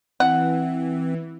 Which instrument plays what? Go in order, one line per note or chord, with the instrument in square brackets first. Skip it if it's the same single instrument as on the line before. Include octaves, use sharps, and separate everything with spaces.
[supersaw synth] E3 [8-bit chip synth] C4 [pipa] F#5